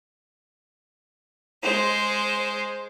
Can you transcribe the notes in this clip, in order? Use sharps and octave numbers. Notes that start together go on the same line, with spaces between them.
G#3 C5